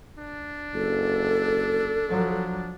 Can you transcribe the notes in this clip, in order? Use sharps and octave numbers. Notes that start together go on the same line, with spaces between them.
D4
F#1 A4
F3 F#3